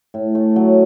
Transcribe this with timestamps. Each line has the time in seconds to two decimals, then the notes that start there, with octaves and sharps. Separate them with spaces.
0.14 A2
0.35 A3
0.56 F#3